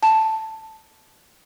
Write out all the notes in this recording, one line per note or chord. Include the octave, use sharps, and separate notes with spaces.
A5